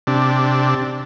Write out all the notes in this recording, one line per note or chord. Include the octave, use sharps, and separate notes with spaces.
C3 D4